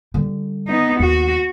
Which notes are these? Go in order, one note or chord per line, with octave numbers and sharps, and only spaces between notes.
D3 G3
B3 D#4
D#2 F#4